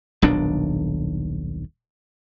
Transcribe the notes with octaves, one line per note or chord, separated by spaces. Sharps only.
D#1 B1 D#3 D4